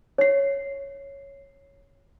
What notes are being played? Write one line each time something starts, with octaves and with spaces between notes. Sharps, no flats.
C#5 C7